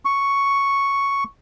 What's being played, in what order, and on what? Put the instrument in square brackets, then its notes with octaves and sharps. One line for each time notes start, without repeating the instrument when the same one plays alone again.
[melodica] C#6